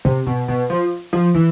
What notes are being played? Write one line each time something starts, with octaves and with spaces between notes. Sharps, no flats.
C3
B2
B2
F3
F3
E3